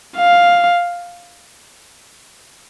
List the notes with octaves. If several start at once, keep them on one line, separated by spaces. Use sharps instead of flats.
F5